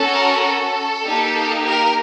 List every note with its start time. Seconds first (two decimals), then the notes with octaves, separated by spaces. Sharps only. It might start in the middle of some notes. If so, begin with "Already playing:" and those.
Already playing: C#4 F#4 A4
0.13 A#4
0.43 A4
1.04 A#3 D#4 G4
1.63 A#4